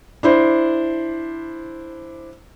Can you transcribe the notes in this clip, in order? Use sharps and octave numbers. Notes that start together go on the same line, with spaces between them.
D4 E4 C5